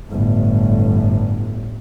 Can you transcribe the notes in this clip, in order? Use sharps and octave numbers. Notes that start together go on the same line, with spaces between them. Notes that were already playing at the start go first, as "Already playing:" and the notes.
G1 A2